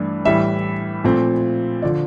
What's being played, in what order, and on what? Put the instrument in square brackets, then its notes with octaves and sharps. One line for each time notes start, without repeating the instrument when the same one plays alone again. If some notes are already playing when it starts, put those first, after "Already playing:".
Already playing: [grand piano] G2 E3 A3 D4
A2 E3 G3 E5
A#2 F3 A3 C4
D3 F3 D5